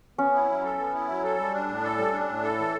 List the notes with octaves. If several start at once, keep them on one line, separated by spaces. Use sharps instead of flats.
B3 C#4
E4
F#3
A4
B3
E4
F#3
A4
G3
D4
A2
A4
G3
D4
A2
A4
E3